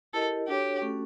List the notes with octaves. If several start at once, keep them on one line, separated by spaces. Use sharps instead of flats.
E4 G4 A4 A#4 D#5
D4 F#4 G4 A4 C#5
A3 C#4 F#4 A4